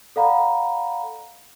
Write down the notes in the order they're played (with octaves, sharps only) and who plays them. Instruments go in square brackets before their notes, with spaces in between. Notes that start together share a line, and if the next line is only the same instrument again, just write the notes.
[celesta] A4 D5 F5 F#5 A#5 B5